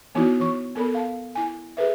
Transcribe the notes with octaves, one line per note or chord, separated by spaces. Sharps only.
E3 B3 D#4 E4 F#4
E3 C#6
B3 A4 A#4 B5
F5 A5
E4 G#5
G#4 A4 B4 E5